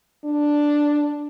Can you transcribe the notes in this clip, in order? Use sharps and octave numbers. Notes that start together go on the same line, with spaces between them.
D4